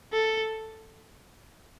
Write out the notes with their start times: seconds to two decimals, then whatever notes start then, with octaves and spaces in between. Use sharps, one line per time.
0.13 A4